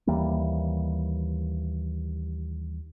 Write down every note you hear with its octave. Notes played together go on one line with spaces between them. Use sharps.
D#2 E3 G3 A#3